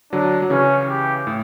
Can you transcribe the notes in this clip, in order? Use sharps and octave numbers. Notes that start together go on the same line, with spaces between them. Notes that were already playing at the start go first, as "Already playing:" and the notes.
D3 F#3 D4
F#3
C#3 E3 C#4
G4
A2